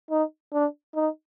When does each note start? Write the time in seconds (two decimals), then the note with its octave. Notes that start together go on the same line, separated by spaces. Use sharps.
0.11 D#4
0.53 D4
0.95 D#4